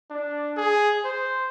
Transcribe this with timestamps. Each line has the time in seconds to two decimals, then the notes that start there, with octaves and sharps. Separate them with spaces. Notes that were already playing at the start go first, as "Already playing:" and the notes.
0.10 D4
0.57 G#4
1.05 C5